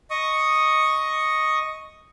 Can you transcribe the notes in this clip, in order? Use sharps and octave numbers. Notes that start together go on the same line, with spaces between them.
D#5 C#6 D#6